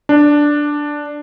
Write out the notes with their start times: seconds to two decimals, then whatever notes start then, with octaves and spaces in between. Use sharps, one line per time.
0.09 D4